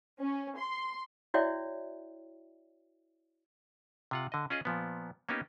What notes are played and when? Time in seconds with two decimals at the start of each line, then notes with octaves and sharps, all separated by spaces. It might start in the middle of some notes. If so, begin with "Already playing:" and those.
0.21 C#4
0.59 C6
1.34 E4 F#4 C#5 D5 E5 G5
4.11 C3 F4 F#5
4.32 D3 D#5
4.50 C#4 F4 G#4 D#5
4.65 A#2 F3 B3
5.29 A#3 B3 C#4 D#4 G4